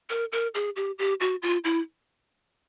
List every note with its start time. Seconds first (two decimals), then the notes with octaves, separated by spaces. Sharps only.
0.10 A#4
0.32 A#4
0.54 G#4
0.76 G4
0.98 G4
1.20 F#4
1.42 F4
1.64 E4